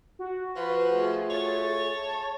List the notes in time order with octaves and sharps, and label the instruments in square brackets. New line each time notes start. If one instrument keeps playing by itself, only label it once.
[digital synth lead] F#4
[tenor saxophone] F3 [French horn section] B4
[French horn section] A3 F4 G#4
[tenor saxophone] C#5 [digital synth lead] A6
[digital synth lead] A5